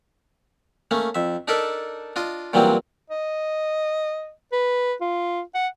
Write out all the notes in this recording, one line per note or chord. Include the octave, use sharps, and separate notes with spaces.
A3 A#3 C#4
F2 E5
D4 D#4 A4 A#4 D5 E5
D4 F4 D#5
A#2 E3 F#3 G3 A#3 C4
D#5
B4
F4
F#5